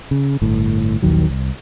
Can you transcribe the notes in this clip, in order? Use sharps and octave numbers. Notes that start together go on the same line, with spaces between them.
C#3
G1 A2
A#1 D#2 D#3 F#3
C2